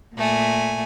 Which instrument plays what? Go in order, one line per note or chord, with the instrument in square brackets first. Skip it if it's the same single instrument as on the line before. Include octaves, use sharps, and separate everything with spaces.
[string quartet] A#2 A3 G#5